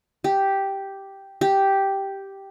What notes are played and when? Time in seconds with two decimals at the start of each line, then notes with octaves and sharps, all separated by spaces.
0.24 G4
1.41 G4